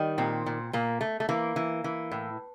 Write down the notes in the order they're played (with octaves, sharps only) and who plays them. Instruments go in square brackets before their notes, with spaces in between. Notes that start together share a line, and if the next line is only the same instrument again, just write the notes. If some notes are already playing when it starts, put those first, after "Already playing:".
Already playing: [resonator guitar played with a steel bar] D#3 G3
A#2 C4
A#2
A#2 A#3
A3
A3
E3 A#3
E3
E3
A2